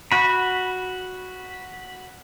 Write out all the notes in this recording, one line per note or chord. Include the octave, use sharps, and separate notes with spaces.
F#4 B5